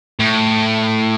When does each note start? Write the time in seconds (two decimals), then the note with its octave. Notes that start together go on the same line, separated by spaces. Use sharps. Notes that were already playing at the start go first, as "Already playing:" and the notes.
0.19 A2